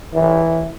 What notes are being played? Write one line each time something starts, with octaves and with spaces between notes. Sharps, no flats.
E3